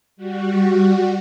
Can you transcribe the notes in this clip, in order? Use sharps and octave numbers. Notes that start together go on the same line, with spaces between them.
G3 F#4